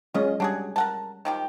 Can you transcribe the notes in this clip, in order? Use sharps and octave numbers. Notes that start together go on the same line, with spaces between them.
F#3 G#3 C#4 F4 D#5
G3 D4 F#4 G#4
A#4 F#5 A5
D#3 F3 G4